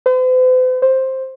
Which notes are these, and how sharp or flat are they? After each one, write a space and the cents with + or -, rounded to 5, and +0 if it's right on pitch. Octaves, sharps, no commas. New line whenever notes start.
C5 -45
C5 +10